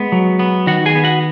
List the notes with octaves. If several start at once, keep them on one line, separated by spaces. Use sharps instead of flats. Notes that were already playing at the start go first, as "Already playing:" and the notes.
Already playing: G#3 B3
F#3
B3
D#3 F#4 F#5
G#4 G#5
B3
F#4 F#5